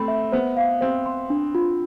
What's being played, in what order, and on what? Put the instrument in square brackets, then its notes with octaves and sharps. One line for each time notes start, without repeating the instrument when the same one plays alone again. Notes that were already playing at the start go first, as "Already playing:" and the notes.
Already playing: [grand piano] A3 C4 [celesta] B5
[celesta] E5
[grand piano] B3 [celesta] C5
[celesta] F5
[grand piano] C4 [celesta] C5
[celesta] C6
D4
F4